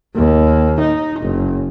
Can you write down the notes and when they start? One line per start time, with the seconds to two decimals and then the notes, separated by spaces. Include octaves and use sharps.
0.16 D#2
0.79 D#4
1.20 F#1